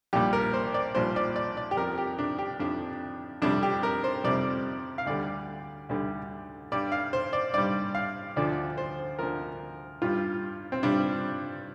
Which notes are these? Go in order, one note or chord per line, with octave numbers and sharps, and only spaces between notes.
A#1 A#2 G3 G4
A#4
C5
D5
A#1 A#2 G3 C5
D5
D5
D5
G4
F2 F3 A#4
G4
D4
G4
F2 F3 D4
F2 C3 G3 D4
G4
A#4
C5
F2 C3 G3 D5
F5
D2 D3 G3 D5
D2 D3 G3
G2 G3 D5
F5
C5
D5
G2 G3 D5
F5
D2 D3 F3 D5
C5
D2 D3 F3 A#4
G2 G3 F4
C4
G2 G3 D4